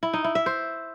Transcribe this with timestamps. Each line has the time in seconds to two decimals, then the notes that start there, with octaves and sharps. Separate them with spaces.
0.03 E4
0.14 D#4
0.24 E4
0.35 E5
0.46 C5